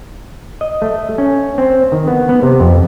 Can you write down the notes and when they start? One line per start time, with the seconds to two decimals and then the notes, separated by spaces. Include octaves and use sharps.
0.61 D#5
0.82 A3
1.18 C#4
1.58 C4
1.92 D#3
2.08 B3
2.29 B3
2.43 C3
2.60 F2